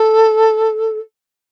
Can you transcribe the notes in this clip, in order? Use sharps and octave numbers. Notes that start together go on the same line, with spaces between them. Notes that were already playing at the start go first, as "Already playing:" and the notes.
Already playing: A4